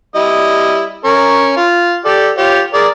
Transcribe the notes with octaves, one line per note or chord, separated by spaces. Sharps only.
G3 E4 D#5
C#4 A#4 C#6
F4
G4 A4 D5
F4 G4 C#5
G#4 A#4 D5